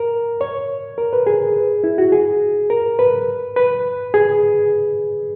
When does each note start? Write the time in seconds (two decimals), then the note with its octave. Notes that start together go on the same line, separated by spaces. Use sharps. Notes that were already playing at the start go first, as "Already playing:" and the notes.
Already playing: A#4
0.41 C#5
0.98 A#4
1.13 B4
1.27 G#4
1.84 E4
1.98 F#4
2.12 G#4
2.70 A#4
2.99 B4
3.56 B4
4.14 G#4